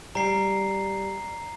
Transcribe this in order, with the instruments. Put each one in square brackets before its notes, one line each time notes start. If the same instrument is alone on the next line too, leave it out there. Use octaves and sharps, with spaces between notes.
[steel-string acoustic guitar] G3 [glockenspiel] A#5 C7